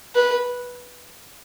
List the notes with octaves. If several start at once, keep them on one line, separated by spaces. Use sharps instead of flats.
B4